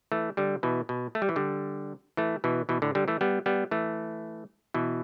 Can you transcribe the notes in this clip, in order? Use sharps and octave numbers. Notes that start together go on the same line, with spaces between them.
E3 A3
D3 G3
B2 E3
B2
A3
G3
E3
D3 G3
E3 A3
B2 E3
B2 E3
A2 D3
D3 G3
E3 A3
G3 B3
G3 B3
E3 A3
B2 E3